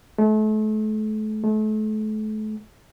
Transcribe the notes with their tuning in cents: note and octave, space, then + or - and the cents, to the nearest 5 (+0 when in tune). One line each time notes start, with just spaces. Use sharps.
A3 -35
A3 -35